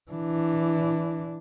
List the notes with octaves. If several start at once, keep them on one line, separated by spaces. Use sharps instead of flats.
E3 D4